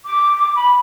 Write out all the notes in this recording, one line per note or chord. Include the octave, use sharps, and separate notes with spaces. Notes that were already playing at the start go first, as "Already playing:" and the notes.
D6
B5